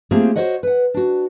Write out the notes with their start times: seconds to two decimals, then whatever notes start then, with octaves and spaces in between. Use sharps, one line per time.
0.11 A3 A#3 C4 F4 G4 G#4
0.36 F#4 A4 C5 C#5 D#5 F#5
0.63 B4 F#5
0.94 D4 F#4